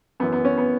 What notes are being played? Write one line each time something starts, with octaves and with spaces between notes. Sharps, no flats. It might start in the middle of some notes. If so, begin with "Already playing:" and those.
F#2 E3 B3
B3
C#4
B3